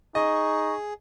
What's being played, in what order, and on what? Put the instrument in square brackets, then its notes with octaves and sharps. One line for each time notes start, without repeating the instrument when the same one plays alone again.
[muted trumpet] D#4 [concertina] G#4 [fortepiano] D#5 [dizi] C#6